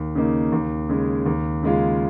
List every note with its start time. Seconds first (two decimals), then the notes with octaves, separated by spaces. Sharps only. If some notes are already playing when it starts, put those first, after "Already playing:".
Already playing: D#2
0.15 C#3 A#3 D#4
0.52 D#2
0.89 C#3 G#3
1.26 D#2
1.63 C#3 G#3 F4